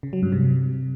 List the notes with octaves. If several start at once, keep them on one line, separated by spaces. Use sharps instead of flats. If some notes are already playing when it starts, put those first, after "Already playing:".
C#3
F#3
G2
C3